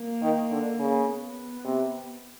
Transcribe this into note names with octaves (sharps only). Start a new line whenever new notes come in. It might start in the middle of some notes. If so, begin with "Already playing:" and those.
Already playing: A#3
D#3
D3
C#3
B3
C3